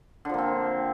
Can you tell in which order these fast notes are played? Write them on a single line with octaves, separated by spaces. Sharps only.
D3 F3 A#3 C4